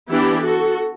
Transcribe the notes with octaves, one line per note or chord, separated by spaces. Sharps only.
E3 B3 D4 E4 G4
F#4 A4